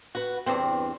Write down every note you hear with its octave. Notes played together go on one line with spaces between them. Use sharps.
F#4 B4
E2 G2 C4